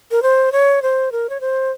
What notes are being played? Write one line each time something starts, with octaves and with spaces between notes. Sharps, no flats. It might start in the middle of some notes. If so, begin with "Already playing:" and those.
A#4
C5
C#5
C5
A#4
C#5
C5